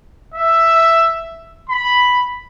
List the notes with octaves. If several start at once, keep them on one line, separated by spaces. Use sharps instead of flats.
E5
B5